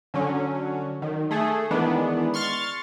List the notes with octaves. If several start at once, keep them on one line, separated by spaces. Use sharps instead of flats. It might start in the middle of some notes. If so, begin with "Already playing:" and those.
D3 F#3 C#4
D#3
A3 G#4 A4
D#3 E3 G#3 B3 D4
C6 C#6 F6 A6